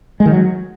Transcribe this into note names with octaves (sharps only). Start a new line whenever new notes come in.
G#3
D#3
F#3